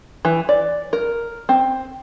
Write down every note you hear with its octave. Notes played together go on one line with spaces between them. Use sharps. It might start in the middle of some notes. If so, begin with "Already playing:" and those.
E3
D5
A#4
C4